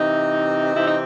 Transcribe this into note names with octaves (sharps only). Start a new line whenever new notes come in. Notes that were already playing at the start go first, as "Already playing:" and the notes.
Already playing: C3 E3 C4 D#4
C3 E3 C4 E4
D#4